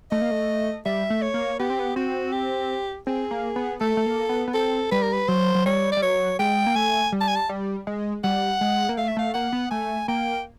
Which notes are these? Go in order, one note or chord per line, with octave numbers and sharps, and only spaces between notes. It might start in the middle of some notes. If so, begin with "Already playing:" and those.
A3 D#5
A#3
A3
G3 E5
A3
C#5
A#3
B3 G4
C4
B3
C4 F#4
G4
C4 G#4
A#3
B3
A3 A4
A3
A#3
B3
B3
C4 A4
G3 B4
A#4
B4
F#3 C5
F#3
G3 C#5
G3 D5
F#3 C#5
G#3 G5
A#3
A3 G#5
G3
A5
G#5
A5
G3
G#3
G3 F#5
G#3
A#3
A3 F5
E5
A3 F5
A#3 F#5
B3
A3 G#5
A#3 G5